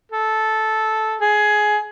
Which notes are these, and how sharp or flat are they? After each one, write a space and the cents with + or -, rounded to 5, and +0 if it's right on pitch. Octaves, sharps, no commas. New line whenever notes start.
A4 -10
G#4 +15